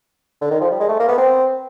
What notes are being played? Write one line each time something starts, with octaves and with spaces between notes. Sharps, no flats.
D3
D#3
F3
G3
G#3
A3
A#3
B3
C4